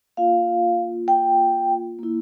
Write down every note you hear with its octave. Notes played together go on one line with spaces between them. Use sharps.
A#3 F4 F5
G5
A#3 E4